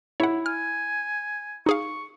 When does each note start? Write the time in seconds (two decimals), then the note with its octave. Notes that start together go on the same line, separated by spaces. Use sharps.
0.20 E4 C#5 F#5
0.46 G#5 F6
1.66 D#4 G#4 F5 C#6